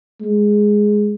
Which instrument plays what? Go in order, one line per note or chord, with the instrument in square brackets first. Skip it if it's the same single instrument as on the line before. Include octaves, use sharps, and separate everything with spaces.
[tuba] G#3